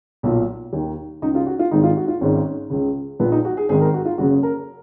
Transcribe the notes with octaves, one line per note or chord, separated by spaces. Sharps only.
B1 A#2
D#2 D#3
C#2 C#3 D#4
F4
F#4
F4
G#1 G#2 D#3 D#4
F4
F#4
F4
G#1 G#2 D#3 C#4
C#2 C#3
A#1 A#2 B3
D#4
F#4
G#4
G#1 G#2 D#3 G#4
A#4
F#4
F4
F#1 F#2 C#3 F#4
A#4